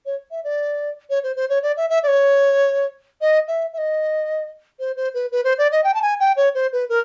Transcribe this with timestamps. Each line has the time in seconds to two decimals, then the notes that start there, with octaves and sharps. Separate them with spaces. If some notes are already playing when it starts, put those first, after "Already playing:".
0.06 C#5
0.31 E5
0.44 D5
1.10 C#5
1.23 C5
1.36 C5
1.49 C#5
1.63 D5
1.77 E5
1.90 E5
2.03 D5
2.07 C#5
3.21 D#5
3.48 E5
3.73 E5
3.78 D#5
4.80 C5
4.96 C5
5.14 B4
5.32 B4
5.44 C5
5.58 D5
5.72 D#5
5.84 G5
5.94 A5
6.02 G#5
6.20 G5
6.37 C#5
6.55 C5
6.73 B4
6.89 A#4